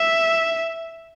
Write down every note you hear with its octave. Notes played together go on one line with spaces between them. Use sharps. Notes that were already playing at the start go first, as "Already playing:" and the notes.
Already playing: E5